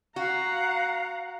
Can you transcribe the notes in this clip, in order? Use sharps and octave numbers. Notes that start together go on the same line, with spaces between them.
F#4 F5 F#5 A#5